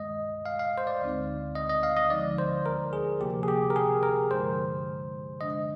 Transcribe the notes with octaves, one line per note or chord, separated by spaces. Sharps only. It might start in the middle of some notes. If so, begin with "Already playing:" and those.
Already playing: G2 D#3 G#3 D#5
F5
F5
C5
D5
D2 D3 G#3 C4 D#4
D#5
D#5
F5
D#5
D3 F3 G#3 D#4 D5
C5
A#4
G#4
C3 F3 A#3 G4
G#4
G4
A#4
G#4
A#4
G2 D3 F3 G#3 D#4 C5
D3 G#3 D4 D#5